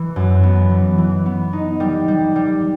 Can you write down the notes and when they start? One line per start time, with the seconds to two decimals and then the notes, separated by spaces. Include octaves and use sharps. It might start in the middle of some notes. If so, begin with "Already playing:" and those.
Already playing: E3
0.16 F#2
0.43 B3
0.71 E3
0.98 E3
1.26 B3
1.53 D#4
1.80 G3
2.08 G3
2.36 G3